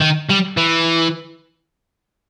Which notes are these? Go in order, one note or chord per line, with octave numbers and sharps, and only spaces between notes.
D#3
G3
E3